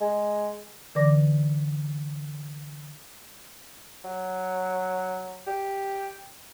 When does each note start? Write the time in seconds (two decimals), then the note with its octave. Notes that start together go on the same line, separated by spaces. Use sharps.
0.01 G#3
0.95 D3 E3 B4 D5 D6 A#6
4.05 F#3
5.47 G4